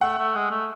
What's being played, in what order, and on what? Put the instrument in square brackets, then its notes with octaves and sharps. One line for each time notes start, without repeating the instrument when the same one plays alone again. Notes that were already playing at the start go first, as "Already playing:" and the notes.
[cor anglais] A3 [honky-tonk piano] F#5
[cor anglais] A3
G#3
A3